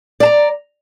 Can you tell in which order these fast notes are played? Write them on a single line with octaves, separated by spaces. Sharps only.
D5 A5 A#5